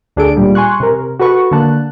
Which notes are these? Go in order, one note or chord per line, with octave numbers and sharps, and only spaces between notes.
D2 D4 G#4 A4 D7
A#2 G3
G#5 C6 C#6 F#6
C3 A#4
F#4 A4 B4 C#6
D3 A#3 A5 F#6